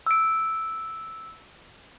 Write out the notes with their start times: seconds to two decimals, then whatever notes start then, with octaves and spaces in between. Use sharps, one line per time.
0.06 E6 D7